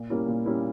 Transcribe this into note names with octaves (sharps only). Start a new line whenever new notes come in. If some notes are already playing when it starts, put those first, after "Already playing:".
Already playing: A#2
G3 A#3 C#4 E4
A#2
G3 A#3 C#4 E4